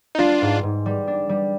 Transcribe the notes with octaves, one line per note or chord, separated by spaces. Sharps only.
D#4
G3 D4 F4
G#2
G#2
G3
D4
G3